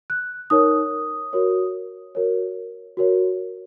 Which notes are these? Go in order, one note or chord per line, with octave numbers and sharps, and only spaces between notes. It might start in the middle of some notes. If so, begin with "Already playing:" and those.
F#6
D#4 A#4 C#5 D#6
F#4 A#4 C#5
F#4 A#4 C#5
F#4 A#4 C#5